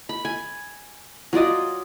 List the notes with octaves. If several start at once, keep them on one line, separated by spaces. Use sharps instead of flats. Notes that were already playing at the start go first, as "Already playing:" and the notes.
B5
G#5
F#3 F4 D5 D#5